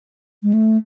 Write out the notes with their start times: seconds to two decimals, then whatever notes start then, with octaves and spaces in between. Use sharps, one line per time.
0.43 G#3
0.54 A3